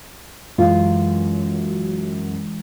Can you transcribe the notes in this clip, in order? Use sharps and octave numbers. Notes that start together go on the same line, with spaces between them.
F#2 E3 G#3 F4